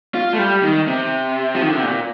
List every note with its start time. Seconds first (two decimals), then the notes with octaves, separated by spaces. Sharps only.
0.15 F4
0.33 A3
0.38 G3
0.63 D#3
0.88 C3
1.55 F3
1.62 D#3
1.68 D3
1.77 C3
1.83 A#2